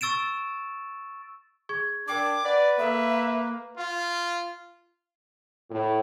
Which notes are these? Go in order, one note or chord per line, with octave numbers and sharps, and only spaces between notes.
C#6 E6 A6 D7 E7
G#4 C#6 G#6
D4 A#4 G5 D6 G#6
B4 D5 F#5
A#3 A4 A#4 E5
F4
A2